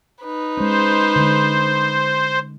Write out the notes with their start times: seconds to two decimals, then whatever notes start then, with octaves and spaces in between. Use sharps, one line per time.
0.22 D#4 B4
0.57 G#3 C#4 C5
1.16 D3 G#3